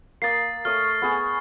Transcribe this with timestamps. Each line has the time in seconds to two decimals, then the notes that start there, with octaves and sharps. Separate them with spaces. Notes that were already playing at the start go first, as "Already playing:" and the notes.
0.22 A#3 D#6 A6 C7
0.65 A3 C#5 D#6 F6
1.02 B3 G#4 C#6